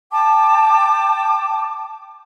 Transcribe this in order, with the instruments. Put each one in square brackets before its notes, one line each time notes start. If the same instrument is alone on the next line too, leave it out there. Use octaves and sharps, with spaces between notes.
[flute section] G5 A5 D6